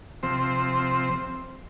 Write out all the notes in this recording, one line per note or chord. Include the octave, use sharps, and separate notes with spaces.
C3 F3 C4 C5